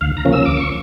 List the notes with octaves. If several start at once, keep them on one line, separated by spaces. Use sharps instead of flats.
D2 F5
A#5
C#3 F3 A#3 C#4
E6
D2 D6
C#6